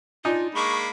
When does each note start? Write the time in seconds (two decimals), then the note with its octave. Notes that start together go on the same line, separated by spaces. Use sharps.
0.25 D4 D#4 F4 G#5
0.55 G#3 A#3 B5 C#6